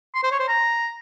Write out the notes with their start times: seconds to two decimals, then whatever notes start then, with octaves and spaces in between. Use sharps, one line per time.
0.15 C6
0.23 C5
0.31 C#5
0.40 C5
0.48 A#5